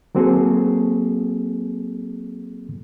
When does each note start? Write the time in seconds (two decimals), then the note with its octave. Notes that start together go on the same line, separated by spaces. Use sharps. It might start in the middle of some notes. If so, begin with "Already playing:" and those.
0.15 F#3 A#3 C4 F#4 G#4 A4